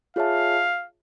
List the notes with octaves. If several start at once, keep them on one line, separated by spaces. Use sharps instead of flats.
F4 G#4 C#5 E5 F5 A5